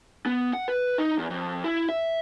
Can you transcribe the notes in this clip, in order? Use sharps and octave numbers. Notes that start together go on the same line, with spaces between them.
B3
F#5
B4
D#4
E2
F2
E4
E5